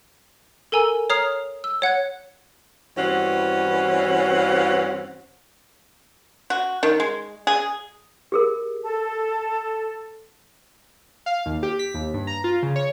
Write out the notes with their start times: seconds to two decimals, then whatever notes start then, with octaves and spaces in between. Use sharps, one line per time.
0.72 A4 A#4 G#5 A#5 E6
1.10 C#5 A#5 D#6 F6 C7 F7
1.64 E6
1.82 C#5 F#5 F#6 G#6
2.97 G2 E3 C4 C#4 F#4 F#5
6.50 F#4
6.83 D#3
7.00 G#3
7.47 G#4
8.32 G4 G#4 A#4
8.83 A4
11.26 F5
11.46 D#2
11.63 G4
11.79 B6
11.94 D#2
12.14 G2
12.27 A#5
12.44 F4
12.63 C#3
12.76 C#5